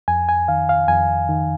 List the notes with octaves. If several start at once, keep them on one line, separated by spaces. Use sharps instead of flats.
F2 G#5
G#5
D#3 F5
F5
F2 G#5
D#3